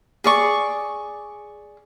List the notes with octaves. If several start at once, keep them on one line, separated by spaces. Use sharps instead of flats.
G#4 D5 C#6